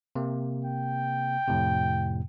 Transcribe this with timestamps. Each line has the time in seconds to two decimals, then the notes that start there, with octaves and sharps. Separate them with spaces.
0.15 C3 A#3
0.65 G5
1.47 F2 A2 C3